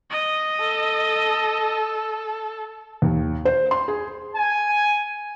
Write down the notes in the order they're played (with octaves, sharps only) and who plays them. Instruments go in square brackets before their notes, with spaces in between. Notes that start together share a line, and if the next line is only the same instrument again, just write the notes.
[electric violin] D#5
[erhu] A4
[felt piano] D#2
C5
C6
G#4
[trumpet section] G#5